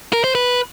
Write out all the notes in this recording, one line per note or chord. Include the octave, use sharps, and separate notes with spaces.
A#4
C5
B4